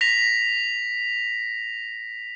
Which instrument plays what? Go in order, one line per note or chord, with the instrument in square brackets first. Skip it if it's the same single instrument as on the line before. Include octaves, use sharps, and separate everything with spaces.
[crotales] A#6 B6 F7